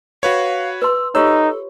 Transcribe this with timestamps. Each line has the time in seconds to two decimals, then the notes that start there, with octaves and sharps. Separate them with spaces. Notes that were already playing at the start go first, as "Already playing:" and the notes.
0.23 F#4 B4 C#5 F5
0.82 B4 C6 E6
1.15 D#4 F4 G4 A4 C#5 E6